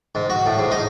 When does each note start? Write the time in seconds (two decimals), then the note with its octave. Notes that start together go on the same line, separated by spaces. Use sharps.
0.15 G#2
0.30 F#4
0.46 A2
0.59 G#2
0.71 D#4